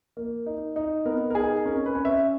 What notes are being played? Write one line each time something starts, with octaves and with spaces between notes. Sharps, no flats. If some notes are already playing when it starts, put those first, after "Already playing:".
A#3
D#4
D#4
B3 A#4
A#4
D#4 G#4
C#4 A#4
B4
C#4
E5